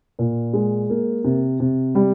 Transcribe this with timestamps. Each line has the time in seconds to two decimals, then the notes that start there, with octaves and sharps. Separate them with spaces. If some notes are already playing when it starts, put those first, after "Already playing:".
0.19 A#2
0.53 G#3
0.90 A#3
1.24 C3
1.60 C3
1.95 G3